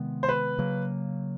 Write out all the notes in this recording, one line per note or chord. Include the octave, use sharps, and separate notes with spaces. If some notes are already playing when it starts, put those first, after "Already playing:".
Already playing: C3 D#3 G#3 B3
C5
B4
C#3 F#3 A#3